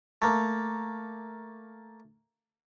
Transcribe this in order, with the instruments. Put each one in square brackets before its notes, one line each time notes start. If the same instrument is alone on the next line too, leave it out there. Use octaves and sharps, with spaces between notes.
[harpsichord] A3 A#3